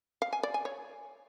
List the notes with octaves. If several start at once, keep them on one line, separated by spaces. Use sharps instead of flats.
F5
G#5
D5
G#5
C#5